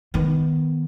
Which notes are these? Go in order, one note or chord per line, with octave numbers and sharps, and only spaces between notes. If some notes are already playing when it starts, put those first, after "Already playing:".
D#3 B3